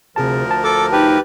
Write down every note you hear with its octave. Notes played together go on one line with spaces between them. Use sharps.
D2 C3 F3 G#4 A#4 A5
A5
A4 D6
D#4 G4 B4